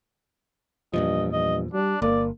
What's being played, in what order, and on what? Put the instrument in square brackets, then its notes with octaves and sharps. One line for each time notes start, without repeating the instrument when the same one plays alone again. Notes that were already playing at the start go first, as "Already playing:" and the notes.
[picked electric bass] E2 A#2 F3 [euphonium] G2 [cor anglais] D#5
[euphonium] G2 [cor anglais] D#5
[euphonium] G3 [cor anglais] D4
[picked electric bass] G1 [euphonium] A#3 [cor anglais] D5